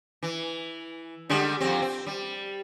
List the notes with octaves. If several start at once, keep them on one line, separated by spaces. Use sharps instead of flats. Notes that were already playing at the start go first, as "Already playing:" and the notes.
E3
D3 G3 G#3
F2 C4
C4
G3